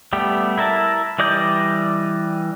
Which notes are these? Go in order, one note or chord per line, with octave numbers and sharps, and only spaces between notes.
G3 A3 B3 G4
E4 A#4 E5 A5
E3 G3 D5 D#5 G6